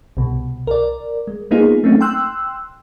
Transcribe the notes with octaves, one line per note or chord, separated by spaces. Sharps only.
C2 B2
A#4 D5
G#3
G#3 A#3 B3 D#4 F4 G#4
F#3 A3 A#3 C4 C#4 D#4
G5 C6 E6 F#6